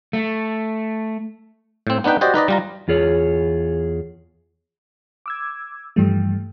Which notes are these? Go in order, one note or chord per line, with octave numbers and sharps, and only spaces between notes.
A3
A2 C4
B3 D4 D#4 B4 G5
F#4 G4 C5 D5 D#5
D#4 B4 D5 D#5
G3 F4 A#5
E2 F4 G#4 C#5
D6 E6 G#6
G2 E3 F3 G3 A3